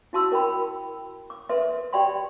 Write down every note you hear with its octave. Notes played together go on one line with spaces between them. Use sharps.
E4 F#4 A5 C6 E6
A#4 G5 B5
D6
A4 B4 E5 C6
G4 D5 G5 B5 C6